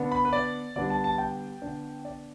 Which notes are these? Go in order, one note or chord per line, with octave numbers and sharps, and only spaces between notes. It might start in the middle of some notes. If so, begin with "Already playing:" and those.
Already playing: D3 B3 D4
B5
B4
D5
D3 G3 B3 D4 D5
A5
A5
G5
D3 B3 D4
D5